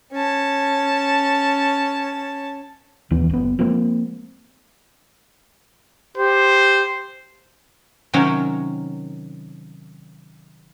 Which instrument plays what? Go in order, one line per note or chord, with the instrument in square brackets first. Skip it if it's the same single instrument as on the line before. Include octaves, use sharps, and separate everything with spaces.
[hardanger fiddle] C#4 A5
[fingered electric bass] D1 D#2 E3 B3
F#1 B3
F3 G#3 A#3 C4
[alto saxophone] G4 [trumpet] C5
[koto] C3 D#3 F#3 C#4 A#4